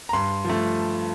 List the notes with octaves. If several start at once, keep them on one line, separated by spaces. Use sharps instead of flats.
A#5
G2 C6
F3 A3